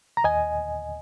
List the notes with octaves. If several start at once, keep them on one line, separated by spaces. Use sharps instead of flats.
A#5
D#2 D#5 G#5